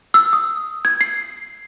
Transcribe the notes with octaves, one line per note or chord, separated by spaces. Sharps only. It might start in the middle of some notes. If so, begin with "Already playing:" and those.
E6
D#6
G#6
C7